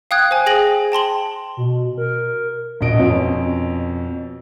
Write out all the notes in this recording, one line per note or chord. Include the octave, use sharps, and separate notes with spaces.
F5 G5 D#6 F#6 G#6
C5 G#5
G#4 G5 A#6 F#7
G5 A5 C6 F#7
B2
A#4
E1 A#1 F#4 D#5 D7
F2 B2 C#4